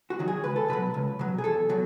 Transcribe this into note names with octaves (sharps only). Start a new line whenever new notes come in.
F#4
D#3 F#3
G#4
C#2 B4
A4
B2 F#3 B4
C#2
B2 F#3
G#4
E2 A4
B2 F#3